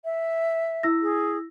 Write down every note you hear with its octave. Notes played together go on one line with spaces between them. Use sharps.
E5
E4 E6 A#6
G#4